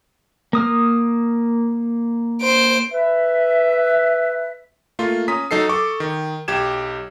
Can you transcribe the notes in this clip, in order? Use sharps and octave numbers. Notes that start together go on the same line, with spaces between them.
A#3 D#6 F6
C5 D7
B4 E5
A3 A#3 F4
C#4 A#5 D#6 B6
F#3 D#4 A4 C7
A4 C#6 D6
D#3
B1 G4 G#6 E7